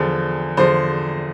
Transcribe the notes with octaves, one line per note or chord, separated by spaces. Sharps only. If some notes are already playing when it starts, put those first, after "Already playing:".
Already playing: E2 D3 F3
E2 D3 F3 C5